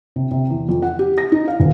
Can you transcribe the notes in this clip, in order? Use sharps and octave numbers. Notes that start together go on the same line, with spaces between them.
C3
C3
E2
F2
F#5
G4
A#6
D#4
F5
D#1